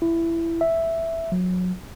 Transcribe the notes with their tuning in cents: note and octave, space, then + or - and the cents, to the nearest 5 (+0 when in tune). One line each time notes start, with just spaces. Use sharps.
E4 +15
E5 +0
F#3 -25